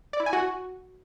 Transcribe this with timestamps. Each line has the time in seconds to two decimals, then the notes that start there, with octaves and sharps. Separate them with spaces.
0.13 D5
0.20 E4
0.26 G#5
0.33 F#4